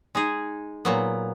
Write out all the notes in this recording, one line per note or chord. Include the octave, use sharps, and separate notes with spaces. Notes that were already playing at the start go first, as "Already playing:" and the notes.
G#3 D#4 G#4
A#2 F#3 B3